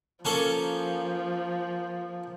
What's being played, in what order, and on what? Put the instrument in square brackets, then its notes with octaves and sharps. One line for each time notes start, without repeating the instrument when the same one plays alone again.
[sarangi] F3 [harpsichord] A#3 C#4 A4